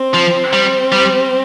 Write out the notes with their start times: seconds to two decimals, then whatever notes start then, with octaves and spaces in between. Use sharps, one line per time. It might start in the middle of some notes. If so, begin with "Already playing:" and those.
Already playing: C4
0.14 F3
0.53 G3
0.92 G3